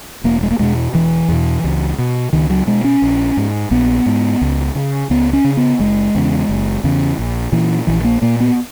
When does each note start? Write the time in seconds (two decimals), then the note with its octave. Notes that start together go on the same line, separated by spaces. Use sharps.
0.24 E1 A#3
0.43 G#3
0.51 A#3
0.59 E2 B2 G#3
0.94 E1 E3
1.28 E2 B2
1.64 C#2
1.98 B2
2.33 C#2 D#3
2.50 F#3
2.67 B2 G#3
2.84 C#4
3.02 A#1
3.37 G#2
3.71 A#1 B3
4.06 G#2
4.41 C#2
4.75 C#3
5.10 C#2 B3
5.33 C#4
5.44 C#3
5.57 B3
5.79 F#1 G#3
6.15 E2 C#3
6.49 F#1
6.84 E2 C#3
7.19 A#1
7.52 A#2 E3
7.87 A#1 E3
8.04 A#3
8.22 A#2 A#3
8.40 B3